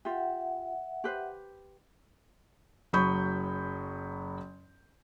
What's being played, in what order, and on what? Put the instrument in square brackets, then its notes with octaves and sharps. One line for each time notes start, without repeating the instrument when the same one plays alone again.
[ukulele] F4 G4 [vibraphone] E5 F#5
[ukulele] G4 B4 C5
[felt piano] F#1 F#3 B5 C#6 D#6 G6